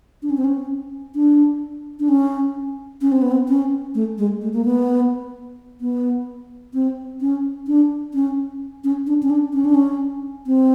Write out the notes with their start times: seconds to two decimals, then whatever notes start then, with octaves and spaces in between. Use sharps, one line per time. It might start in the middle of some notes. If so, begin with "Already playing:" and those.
0.22 D4
0.30 C#4
0.37 C4
0.45 C#4
1.15 D4
2.00 D4
2.09 C#4
3.01 C#4
3.12 C4
3.22 B3
3.32 C4
3.48 C#4
3.95 A3
4.18 G#3
4.41 A3
4.53 A#3
4.65 B3
5.81 B3
6.74 C4
7.21 C#4
7.67 D4
8.14 C#4
8.84 C#4
9.07 D4
9.23 C#4
9.30 D4
9.53 C#4
9.65 D4
9.74 C#4
10.46 C4